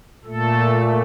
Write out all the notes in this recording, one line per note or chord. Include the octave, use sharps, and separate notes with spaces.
A#2 A3 A4